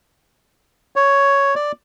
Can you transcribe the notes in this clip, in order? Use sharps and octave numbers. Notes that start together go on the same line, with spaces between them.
C#5
D5